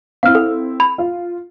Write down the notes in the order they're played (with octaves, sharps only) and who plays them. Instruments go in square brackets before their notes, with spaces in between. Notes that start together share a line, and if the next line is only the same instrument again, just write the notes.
[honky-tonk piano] C4 E4 [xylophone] F5 F6
[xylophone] A4
B5
[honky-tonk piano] F4